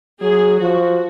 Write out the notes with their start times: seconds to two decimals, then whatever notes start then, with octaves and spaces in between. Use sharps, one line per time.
0.22 F#3 G#4
0.60 F3 F#4